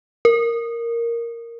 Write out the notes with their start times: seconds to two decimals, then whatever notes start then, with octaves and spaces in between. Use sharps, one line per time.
0.25 A#4